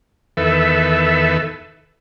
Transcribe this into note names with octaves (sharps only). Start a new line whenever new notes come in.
E2 D#3 A4 B4 E5